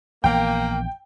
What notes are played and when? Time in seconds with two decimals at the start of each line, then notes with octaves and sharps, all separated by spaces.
0.24 A#1 E3 A#3 B3 G5